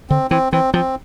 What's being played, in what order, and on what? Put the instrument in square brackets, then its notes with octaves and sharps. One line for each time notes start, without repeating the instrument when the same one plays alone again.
[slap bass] D3 [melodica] C4
[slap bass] E3 [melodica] C4
[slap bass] E3 [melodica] C4
[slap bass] F3 [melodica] C4